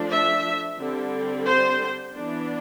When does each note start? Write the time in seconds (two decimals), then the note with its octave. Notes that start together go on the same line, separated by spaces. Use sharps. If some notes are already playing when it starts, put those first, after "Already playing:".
Already playing: F3 A3 D4
0.11 E5
0.79 D3 G3 C4
1.46 C5
2.13 E3 B3 D4